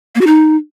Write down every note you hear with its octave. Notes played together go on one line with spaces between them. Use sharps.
A#3
F#4
D#4